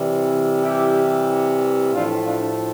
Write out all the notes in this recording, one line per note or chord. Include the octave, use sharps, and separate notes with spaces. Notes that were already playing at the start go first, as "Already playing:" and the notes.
Already playing: C3 E3 G3
E4 G4
A2 F3 A3 D4 F4
D4 F4